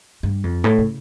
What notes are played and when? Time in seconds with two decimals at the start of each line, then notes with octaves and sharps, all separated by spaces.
0.23 G2
0.44 F2
0.64 A2
0.78 C#3